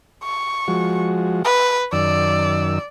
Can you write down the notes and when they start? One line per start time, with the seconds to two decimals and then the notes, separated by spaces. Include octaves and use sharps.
0.23 C#6
0.68 F3 G#3 F#4
1.45 B4
1.93 F#2 D#3 D5 E6